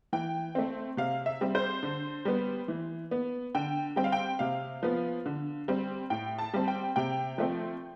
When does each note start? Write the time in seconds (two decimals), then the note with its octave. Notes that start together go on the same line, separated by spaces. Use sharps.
0.13 E3 G5
0.55 A3 C4
0.97 C3 F5
1.26 E5
1.41 G3 C4
1.55 C5
1.83 D3
2.25 G3 B3
2.68 E3
3.11 B3
3.55 D3 G5
3.96 G3 C4 G5
4.04 F5
4.12 G5
4.39 C3 F5
4.83 F3 B3
5.26 D3
5.68 G3 C4
6.10 A2 G5
6.38 A5
6.54 G3 C4
6.68 G5
6.96 C3 G5
7.38 F3 A3 C4